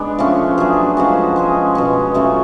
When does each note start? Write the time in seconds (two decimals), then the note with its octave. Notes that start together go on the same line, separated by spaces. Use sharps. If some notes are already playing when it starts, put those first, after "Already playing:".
Already playing: G#3 B3 D4
0.19 F3 A3 C#4
0.58 F#3 A3 D4 G#4
0.97 F3 G#3 C#4 F#4
1.36 G#3 C#4 G#4
1.75 B2 G#3 C#4
2.14 F#3 A3 C#4 F4